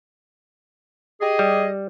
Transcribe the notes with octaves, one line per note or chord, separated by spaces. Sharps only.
G4 G#4 D#5
G3